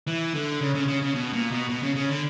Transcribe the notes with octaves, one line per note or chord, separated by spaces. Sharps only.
E3
D3
C#3
C#3
C#3
C#3
B2
A#2
B2
B2
C#3
C#3
D3